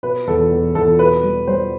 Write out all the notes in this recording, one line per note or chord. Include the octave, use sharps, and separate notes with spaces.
B2 B4
E2 A4
E2
E2 A4
B2 B4
G3
G3 C5